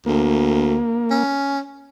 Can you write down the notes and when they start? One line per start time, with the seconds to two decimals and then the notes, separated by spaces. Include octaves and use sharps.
0.06 D2 A#3
1.10 C#4